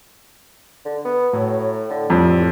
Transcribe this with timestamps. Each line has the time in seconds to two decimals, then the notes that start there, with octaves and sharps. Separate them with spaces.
0.85 D3
1.05 B3
1.33 A2 F#3
1.90 D3
2.10 F2 G3